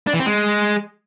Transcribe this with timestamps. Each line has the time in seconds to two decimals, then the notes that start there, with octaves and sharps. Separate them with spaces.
0.07 D4
0.13 E3
0.20 C4
0.26 G#3